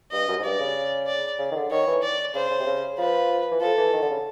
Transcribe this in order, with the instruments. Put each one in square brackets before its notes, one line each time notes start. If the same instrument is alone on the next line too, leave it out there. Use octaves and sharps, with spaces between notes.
[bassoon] G2 [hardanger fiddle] D#5
[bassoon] F#2
G#2
[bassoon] G2 [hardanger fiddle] D5
[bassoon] C#3
[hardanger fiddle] D5
[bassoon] C#3
D#3
D3
[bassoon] D#3 [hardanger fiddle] C#5
[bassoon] E3
[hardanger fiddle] D5
[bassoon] C#3 [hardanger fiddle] C5
[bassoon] C#3
C3
C#3
[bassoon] F3 [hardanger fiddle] B4
[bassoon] E3
[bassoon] F3 [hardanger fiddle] A4
[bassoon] E3
D#3
D3
C#3